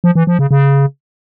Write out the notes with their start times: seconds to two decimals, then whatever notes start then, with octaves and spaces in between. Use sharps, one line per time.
0.04 F3
0.15 E3
0.27 F3
0.39 C#3
0.51 C#3